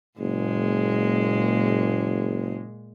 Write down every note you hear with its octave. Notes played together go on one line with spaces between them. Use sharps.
F#1 A#2 G#3